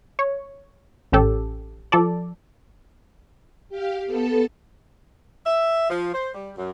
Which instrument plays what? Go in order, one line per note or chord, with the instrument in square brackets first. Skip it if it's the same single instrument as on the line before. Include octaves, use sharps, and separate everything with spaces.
[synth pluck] C#5
A1 C#4 G4 A4
F3 A4 D5
[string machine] G4 F5
B3 A4 A5
[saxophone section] E5
F3
C5
G3
F#2